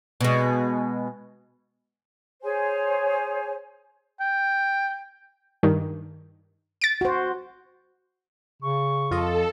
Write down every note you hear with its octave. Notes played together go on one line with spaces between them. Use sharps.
B2 G#3
G#4 C5 C#5 G#5
G5
G2 D#3
A6 D7
F#4 C5
C#3 C#6
F2 F4 A4 D#5